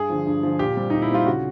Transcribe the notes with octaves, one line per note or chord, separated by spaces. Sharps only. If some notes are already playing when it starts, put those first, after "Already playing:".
Already playing: G2 G#4
D3 F3
G2
D3 F3
A#2 G4
G3 C4
A#2 D#4
E4
G3 C4 F4
C#3 F#4